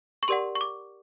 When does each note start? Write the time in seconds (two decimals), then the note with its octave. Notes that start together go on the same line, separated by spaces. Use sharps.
0.23 C#6
0.28 G4 A#4 D5 F#5 C6
0.55 C#6
0.61 D6